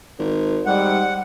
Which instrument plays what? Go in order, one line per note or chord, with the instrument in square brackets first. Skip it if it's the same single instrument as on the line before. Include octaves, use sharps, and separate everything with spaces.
[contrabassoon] G#1
[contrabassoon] G#2 [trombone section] G3 [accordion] F#5